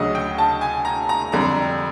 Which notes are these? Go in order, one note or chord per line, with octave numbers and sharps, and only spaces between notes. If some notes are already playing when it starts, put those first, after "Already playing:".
Already playing: D2 C#3 F#3 D#5
G5
A5
G#5
A#5
A#5
F2 D3 G3 A#5